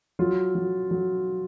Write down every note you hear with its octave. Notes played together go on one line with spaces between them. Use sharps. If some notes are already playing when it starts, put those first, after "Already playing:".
F#3 F4
F#3
F#3